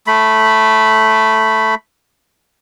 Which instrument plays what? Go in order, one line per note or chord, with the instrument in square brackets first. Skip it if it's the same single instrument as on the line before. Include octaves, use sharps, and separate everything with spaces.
[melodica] A3 B5